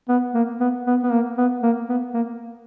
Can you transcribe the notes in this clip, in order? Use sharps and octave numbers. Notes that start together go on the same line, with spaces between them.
B3
A#3
B3
B3
B3
A#3
B3
A#3
B3
A#3